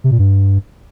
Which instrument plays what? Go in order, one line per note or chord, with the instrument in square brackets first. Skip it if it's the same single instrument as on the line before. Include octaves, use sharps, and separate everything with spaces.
[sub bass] C3
A#2
G2